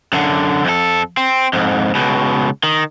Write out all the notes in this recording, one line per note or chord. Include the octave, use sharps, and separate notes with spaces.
F#2 D3
F2 A4
C4
F2 G#2
C#2 B2
D#3